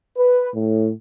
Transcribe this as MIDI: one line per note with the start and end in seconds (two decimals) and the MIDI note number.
0.18 0.48 71
0.55 0.90 45